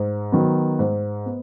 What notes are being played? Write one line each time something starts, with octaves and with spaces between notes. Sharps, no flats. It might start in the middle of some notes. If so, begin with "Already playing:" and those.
Already playing: G#2
D#3 F#3 B3
G#2
B3